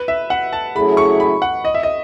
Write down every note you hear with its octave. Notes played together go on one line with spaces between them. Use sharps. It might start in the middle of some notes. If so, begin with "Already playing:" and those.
Already playing: B4
E5
F#5
A5
C#3 F#3 A3 E4 G#4 B5
C#6
B5
F#5
D#5
E5
D#5